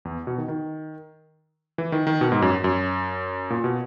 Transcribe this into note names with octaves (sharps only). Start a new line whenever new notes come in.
E2
B2
D#3
D#3
E3
D#3
D#3
B2
G#2
F#2
F#2
A#2
B2